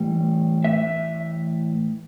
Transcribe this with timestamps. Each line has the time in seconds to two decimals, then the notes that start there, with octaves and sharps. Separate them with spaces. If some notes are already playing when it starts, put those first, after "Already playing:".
Already playing: A2 E3 G3
0.64 E5